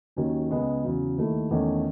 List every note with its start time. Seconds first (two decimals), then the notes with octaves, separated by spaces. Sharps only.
0.16 D#2 D#3 F#3 C#4
0.51 C#2 C#3 G#3 B3
0.84 E2 C#3 F#3
1.18 D#2 D#3 A3 E4
1.51 E2 D#3 A3 C#4